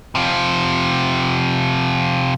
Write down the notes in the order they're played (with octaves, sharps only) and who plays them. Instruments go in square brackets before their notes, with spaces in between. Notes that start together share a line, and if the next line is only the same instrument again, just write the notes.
[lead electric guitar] C3 F3